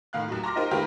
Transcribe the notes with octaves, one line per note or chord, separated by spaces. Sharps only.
A2 D#3 F5 F#6
D#2 F#3
A#5 C6 D6 F6 A#6
D#4 F4 G4 A#4 C5
D#3 A3 F4 G4 A#4 B4